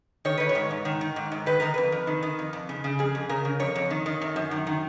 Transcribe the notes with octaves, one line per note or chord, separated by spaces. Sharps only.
D#3 C#5
D#3 B4
C#5
G#2
G#2
D#3
D#3
G#2
G#2
D#3 B4
D#3 A#4
F2 B4
F2
D#3
D#3
F2
F2
C#3
C#3
F2 G#4
F2
C#3 A#4
C#3
F2 C#5
F2
D#3
D#3
F#2
F#2
D#3
D#3